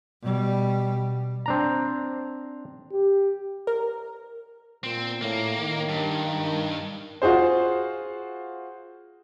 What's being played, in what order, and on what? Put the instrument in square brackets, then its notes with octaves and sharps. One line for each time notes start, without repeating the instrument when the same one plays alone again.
[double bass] B2 G3
[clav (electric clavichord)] C4 D4 A#5
[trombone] G4
[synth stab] A#4
[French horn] A#2 [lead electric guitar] C4
[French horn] A2 [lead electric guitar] A#3
[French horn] D#3
[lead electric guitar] G2
[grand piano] F4 F#4 G#4 C5